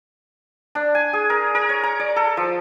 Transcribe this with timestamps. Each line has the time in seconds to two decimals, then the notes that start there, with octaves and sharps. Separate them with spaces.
0.75 D4
0.95 G#5
1.13 G#4
1.30 A#4
1.55 A#4
1.69 C#5
1.83 A#5
2.00 D5
2.16 A4
2.37 F3